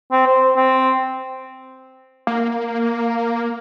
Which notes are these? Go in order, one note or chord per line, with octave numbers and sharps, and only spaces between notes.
C4
C5
C4
A#3